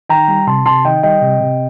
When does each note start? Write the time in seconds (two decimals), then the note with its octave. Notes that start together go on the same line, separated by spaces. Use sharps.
0.09 D#3 G5 A#5
0.28 G3
0.47 C3 A5 C6
0.66 C3 A5 C6
0.85 D#3 D#5 G5
1.03 G3 D#5 G5
1.21 C3
1.40 C3